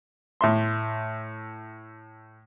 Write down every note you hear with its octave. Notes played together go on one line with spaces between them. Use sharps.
A2 E5 C6